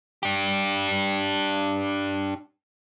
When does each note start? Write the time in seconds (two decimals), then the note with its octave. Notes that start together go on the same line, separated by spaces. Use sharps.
0.23 D4 G4